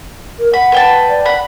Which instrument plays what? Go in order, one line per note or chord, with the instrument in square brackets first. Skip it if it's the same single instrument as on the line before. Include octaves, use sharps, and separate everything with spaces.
[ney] A#4
[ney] F#5 [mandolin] B5
[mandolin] B4 G5 A5
[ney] D5
[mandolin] F#5 B5